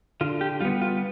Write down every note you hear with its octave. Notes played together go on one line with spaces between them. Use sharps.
D3 F4
G4
G3 B3 F4
F4